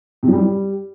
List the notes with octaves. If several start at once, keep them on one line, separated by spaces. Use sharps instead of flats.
C3
F#2
G3